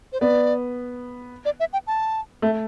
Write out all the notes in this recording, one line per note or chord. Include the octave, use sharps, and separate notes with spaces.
C5
B3 D5
D5
E5
G5
A5
A3